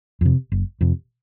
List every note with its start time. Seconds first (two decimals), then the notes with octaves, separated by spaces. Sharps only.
0.21 F2 C3
0.52 F#1
0.81 F2 C3